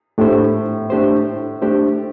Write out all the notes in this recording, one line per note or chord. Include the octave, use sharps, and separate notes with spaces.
A2 A3 D4 G4 C5
A3 D4 G4 C5
A3 D4 G4 C5